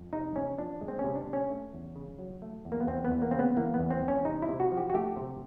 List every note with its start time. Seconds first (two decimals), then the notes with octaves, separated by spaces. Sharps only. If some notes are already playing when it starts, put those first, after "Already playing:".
Already playing: F2
0.13 C3 D#4
0.36 C3 C#4
0.58 F3 D4
0.81 G#3
0.88 C4
0.99 C#4
1.04 C3
1.15 D4
1.28 C3
1.33 C#4
1.50 A3
1.73 E2
1.96 C#3
2.19 F#3
2.42 A3
2.65 E2
2.72 A#3
2.80 B3
2.87 E2 C4
3.05 B3
3.11 E2
3.22 A#3
3.31 C#3 C4
3.39 B3
3.57 E3 A#3
3.74 B3
3.79 E2
3.91 C4
4.02 E2
4.08 C#4
4.25 C3 D#4
4.42 E4
4.49 C3
4.60 F#4
4.72 F3
4.77 G4
4.90 F#4
4.94 A3 G4
5.16 C3